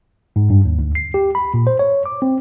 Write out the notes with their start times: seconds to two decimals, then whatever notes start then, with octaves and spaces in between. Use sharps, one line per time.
0.36 G#2
0.50 G2
0.65 D#2
0.79 D2
0.95 C7
1.14 G4
1.35 B5
1.54 A#2
1.67 C5
1.79 C#5
2.06 D6
2.22 C4